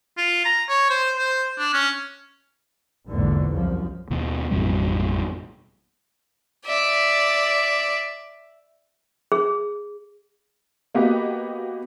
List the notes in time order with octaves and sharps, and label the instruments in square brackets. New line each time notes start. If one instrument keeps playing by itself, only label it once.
[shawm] F4
A#5
C#5
C5
C5
D4
C#4
[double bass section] A#1 E2 G#2 D3
C2 F#2 F3
[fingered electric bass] D#2 B2
A1 F2 B2 G3
[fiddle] D5 E5
[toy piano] G#4
[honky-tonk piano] A#3 B3 F#4 G4 D#5